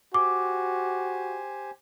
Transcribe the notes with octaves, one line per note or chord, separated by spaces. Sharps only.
F#4 G4 C5 G#5 D6